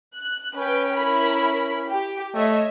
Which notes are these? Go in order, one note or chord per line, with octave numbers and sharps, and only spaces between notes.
F#6
C#4 B4 G5
E4 A#4 B5
G4
A3 C#5 D#5 E5